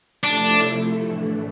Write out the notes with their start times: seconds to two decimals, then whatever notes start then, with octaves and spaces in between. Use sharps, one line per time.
0.23 C3 F3 A3 D4 E4 A4
1.02 A2 E3 A3 D4